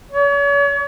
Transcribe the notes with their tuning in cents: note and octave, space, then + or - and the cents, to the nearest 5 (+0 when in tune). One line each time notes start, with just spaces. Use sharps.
C#5 +40